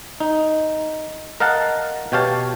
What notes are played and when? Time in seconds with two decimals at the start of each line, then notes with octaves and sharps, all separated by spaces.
0.20 D#4
1.40 A#4 D#5 F5 F#5 A5
2.12 B2 G4 C#5 F5 A5